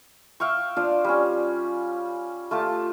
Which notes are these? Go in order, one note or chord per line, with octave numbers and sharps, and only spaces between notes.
E5 F5 G5 C#6
D4 F4 C5 D5
G3 C#4
A3 F4 G4 A5